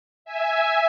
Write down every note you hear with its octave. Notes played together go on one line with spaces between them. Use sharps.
E5 G#5